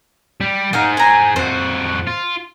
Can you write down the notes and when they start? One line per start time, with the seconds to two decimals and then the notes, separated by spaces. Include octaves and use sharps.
0.40 G3
0.73 D#4 G#4 C5 F5 F#5
0.97 G#5 A#5
1.36 F2 F#4 C5
2.07 F4